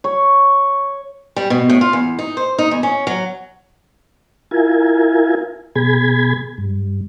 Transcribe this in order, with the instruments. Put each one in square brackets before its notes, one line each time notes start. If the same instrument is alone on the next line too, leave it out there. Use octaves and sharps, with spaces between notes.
[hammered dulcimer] C#5
[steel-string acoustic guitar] G3
B2
A2
F4
E2
D#4
C5
D#4
E2
C#4
F#3
[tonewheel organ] E4 F4 A#4 G#5
B2 G#4 B5 G#6
G2